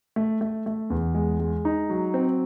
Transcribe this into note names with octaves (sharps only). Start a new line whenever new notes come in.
A3
A3
A3
E2
G#3
G#3
D#4
F#3
C4